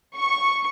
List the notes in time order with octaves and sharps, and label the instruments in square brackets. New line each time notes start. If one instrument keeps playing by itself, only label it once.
[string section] C#6